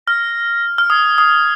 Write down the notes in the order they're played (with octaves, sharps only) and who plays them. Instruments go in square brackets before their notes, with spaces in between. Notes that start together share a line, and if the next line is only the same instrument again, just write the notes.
[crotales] F6 [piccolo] A#6
[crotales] F6
[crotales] D#6 [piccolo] G#6
[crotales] D#6